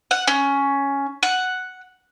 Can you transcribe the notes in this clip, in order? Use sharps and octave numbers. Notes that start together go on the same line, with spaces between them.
F#5
C#4
F#5